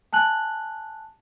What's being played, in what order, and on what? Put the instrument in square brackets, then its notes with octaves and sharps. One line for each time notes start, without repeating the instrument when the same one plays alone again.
[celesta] G#5 A5 F#6 F#7